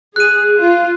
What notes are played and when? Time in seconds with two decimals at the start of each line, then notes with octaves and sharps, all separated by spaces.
0.16 G#4 F#6 D#7
0.59 F4